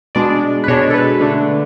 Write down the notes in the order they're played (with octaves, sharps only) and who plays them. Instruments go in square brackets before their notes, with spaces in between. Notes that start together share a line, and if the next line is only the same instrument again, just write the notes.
[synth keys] B2 G#3 D4 D5
B4
B2 G#3 D4 C#5
A4
B4
D3 A3 D4